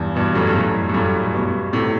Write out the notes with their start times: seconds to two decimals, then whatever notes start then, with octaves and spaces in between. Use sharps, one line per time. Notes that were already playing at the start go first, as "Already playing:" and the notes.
Already playing: E2 G2
0.16 G2 B2
0.35 F#2 A2
0.47 G2
0.55 F#2 A2
0.89 G2
0.94 F#2 A2
1.24 A2
1.34 G2 B2
1.73 A2 C3